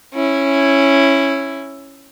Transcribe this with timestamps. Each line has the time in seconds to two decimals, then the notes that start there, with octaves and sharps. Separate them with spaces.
0.14 C#4 E4